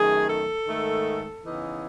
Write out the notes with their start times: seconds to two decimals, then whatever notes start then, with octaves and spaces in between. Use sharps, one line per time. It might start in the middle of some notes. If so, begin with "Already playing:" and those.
Already playing: F#2 D#3 A3 G#4
0.28 A4
0.67 G#2 D#3 A3
1.43 C#3 E3 B3 D#4